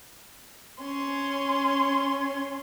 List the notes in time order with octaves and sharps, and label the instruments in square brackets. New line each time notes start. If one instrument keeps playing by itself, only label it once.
[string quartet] C#4 C6